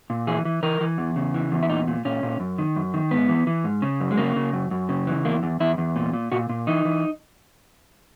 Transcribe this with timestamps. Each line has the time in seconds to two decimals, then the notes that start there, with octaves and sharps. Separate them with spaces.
0.10 A#2
0.27 E3 G#4
0.45 E3
0.63 E3 A#4
0.81 E3
0.98 E2
1.16 C#3
1.34 E3
1.52 E2
1.63 E4
1.69 A#2 D#4
1.88 A#2
2.05 A#2 C#4
2.23 A#2
2.40 F#2
2.58 D#3
2.76 F#2
2.94 D#3
3.11 G#2 B3
3.29 E3
3.47 E3
3.64 G#2
3.82 C#3
4.01 F#2
4.11 G#3
4.18 C#3 A#3
4.36 C#3
4.53 F#2
4.71 F#2
4.89 C#3
5.07 E3
5.25 E2 A#3
5.43 E2
5.60 E2 E4
5.78 E2
5.96 A#2
6.13 A#2
6.32 A#2 F#4
6.49 A#2
6.67 E3 D#4
6.85 E3